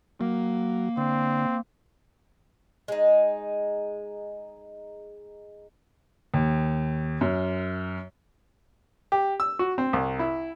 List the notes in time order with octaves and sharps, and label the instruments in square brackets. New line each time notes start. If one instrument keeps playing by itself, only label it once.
[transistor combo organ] F#3 [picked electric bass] A#3
[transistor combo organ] D3 [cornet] C4
[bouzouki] G#3 D#4
[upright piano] D#2
F#2
[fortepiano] G4
E6
F#4
C4
C2
E4